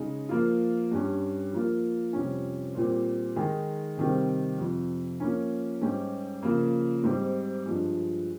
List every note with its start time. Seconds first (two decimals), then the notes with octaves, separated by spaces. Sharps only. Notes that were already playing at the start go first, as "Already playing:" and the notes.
Already playing: C#3 G#3 D#4
0.29 F3 A#3 F4
0.92 G2 G3 C#4
1.53 F3 A#3 F4
2.13 F2 C3 G3 C#4
2.75 A#2 G3 C4
3.36 D#3 G#3 D#4 G#4
3.97 C3 D#3 G3 C4
4.59 F2 C3 F3
5.20 F3 A#3 C#4
5.81 G#2 G3 C#4 G4
6.43 C#3 F3 A#3
7.04 G#2 G3 C4
7.66 G2 F3 G#3